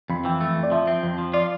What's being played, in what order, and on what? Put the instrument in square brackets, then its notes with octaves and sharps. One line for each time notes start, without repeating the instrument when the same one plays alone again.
[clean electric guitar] F2 [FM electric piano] B5
[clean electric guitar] E3 [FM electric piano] G5
[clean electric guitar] A3
F2
[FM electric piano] D5
[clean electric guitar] F3 [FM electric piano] E5
[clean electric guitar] C4
F2
F3
[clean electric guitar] F4 [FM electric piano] D5